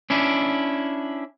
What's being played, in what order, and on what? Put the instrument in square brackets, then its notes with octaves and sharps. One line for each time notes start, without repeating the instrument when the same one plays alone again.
[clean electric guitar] C#4 D4 E4